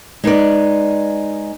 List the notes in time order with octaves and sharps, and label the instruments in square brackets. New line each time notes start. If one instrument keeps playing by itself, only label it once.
[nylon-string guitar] G#3 D#4 B4 D5